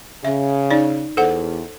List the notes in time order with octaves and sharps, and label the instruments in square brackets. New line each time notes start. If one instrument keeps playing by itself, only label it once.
[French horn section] C#3 [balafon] E5
[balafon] D#4 D5
[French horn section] E2 [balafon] A4 C5 F#5